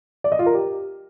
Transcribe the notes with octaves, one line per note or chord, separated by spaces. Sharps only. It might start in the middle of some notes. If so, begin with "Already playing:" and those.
D5
D#5
F4
A#4
G4